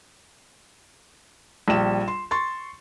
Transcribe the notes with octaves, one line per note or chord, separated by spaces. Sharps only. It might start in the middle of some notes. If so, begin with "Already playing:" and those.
A#1 G3 E7
C6
C6 C#6 A6